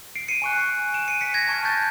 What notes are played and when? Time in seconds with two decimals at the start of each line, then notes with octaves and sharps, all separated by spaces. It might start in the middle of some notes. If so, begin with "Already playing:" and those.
0.15 C7 D7
0.28 C#7 D#7
0.42 G#5 C#6 F#6
0.94 D7 E7
1.08 C#7 D#7
1.21 B6 C#7
1.34 G#6 A#6
1.48 A5 C#6 F6 G#6
1.65 G6 A6